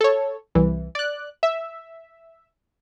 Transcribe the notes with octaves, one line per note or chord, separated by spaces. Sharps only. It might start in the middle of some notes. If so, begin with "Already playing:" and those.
A4 C#5
C2 E3
D5 F#6
E5